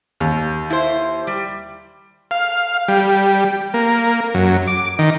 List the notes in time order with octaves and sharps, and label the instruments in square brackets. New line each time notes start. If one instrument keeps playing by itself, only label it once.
[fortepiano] D#2
[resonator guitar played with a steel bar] E4 C5
G3
[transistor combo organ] F5
G3
A#3
F#2
D6
D#3